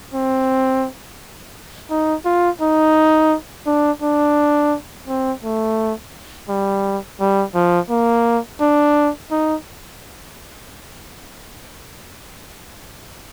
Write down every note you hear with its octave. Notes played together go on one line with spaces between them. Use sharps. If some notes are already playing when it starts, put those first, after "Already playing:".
C4
D#4
F4
D#4
D4
D4
C4
A3
G3
G3
F3
A#3
D4
D#4